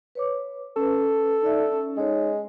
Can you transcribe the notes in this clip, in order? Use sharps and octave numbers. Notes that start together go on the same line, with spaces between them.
B4 C#5 D6
C#4 A4 B4
D#4 D5 E5
C#4
G#3 D#4 C#5